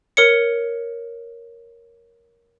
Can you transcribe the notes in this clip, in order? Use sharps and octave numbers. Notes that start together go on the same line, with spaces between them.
A#4 C#5 C#7